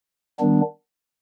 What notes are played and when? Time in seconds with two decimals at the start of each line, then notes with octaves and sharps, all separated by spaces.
0.40 D#3 G3 B3 D4